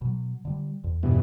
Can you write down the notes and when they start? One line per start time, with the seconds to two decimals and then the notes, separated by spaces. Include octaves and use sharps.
0.02 B2 F#3
0.45 D3 E3 G3
0.84 E2
1.03 G2 B2 E3